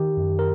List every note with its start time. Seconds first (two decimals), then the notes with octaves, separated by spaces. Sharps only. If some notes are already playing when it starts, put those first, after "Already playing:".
Already playing: D#3 G4
0.17 F#2
0.39 A#4